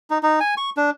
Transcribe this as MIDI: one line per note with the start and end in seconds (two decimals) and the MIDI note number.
0.10 0.18 63
0.23 0.39 63
0.40 0.54 80
0.57 0.70 85
0.77 0.90 62